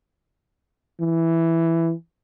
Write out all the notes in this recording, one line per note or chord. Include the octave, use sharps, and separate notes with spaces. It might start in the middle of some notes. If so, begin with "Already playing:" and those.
E3